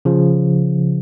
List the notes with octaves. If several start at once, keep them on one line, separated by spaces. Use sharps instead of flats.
C#3 F3